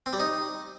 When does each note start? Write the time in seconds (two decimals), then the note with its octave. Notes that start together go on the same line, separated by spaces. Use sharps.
0.06 C4
0.13 G3
0.20 D#4